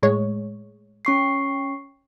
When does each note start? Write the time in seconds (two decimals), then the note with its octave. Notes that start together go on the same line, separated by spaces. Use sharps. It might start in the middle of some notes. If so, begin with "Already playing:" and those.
0.02 A2 G#3 C#5
1.05 C#4 C#6 C7